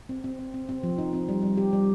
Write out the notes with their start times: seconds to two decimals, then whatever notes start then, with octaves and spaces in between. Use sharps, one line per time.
0.09 C4
0.24 C4
0.39 C4
0.54 C4
0.69 C4
0.83 F3
0.98 D#4
1.13 C4
1.29 G3
1.43 G3
1.57 G4
1.73 G3